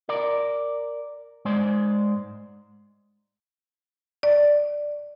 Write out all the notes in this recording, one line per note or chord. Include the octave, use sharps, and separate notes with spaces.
A#4 D5
G#2 G#3 C5 D5
D5